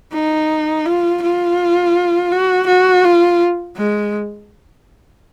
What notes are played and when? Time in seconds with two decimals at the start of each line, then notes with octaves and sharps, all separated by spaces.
0.13 D#4
0.85 F4
1.22 F4
2.32 F#4
2.67 F#4
3.04 F4
3.77 G#3